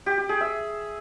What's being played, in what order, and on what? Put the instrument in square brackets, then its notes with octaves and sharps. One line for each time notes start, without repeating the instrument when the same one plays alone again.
[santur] G4
G4
G#4
E5